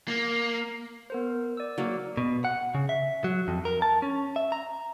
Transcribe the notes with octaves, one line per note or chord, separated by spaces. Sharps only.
A#3
B3 A#4 C5
D5 E6
F#3 A#3
B2
F#5
C#3
E5
F#3
F2
A#4
A5
C#4
E5
A#5